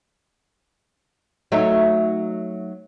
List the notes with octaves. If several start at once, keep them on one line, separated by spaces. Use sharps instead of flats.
F#3 A3 D#4